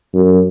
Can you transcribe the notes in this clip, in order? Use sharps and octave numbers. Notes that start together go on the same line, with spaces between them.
F#2